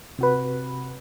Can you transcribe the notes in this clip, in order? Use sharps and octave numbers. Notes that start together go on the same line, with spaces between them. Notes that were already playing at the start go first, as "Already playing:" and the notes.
C3 F#4 B4